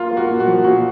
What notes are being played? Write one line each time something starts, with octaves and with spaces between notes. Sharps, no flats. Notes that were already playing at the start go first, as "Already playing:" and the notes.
Already playing: A#3 F4
A#3
F#4
A#2
F#4
F3
A#2 F#4